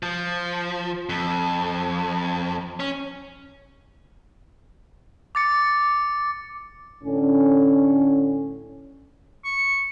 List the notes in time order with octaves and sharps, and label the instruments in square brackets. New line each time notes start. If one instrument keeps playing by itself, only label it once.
[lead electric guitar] F3
F2
C#4
[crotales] D6 A6 C#7
[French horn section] A2 D3 C#4
[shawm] C#6